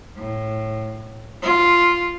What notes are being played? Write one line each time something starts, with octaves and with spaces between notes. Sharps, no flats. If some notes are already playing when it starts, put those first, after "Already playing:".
A2
F4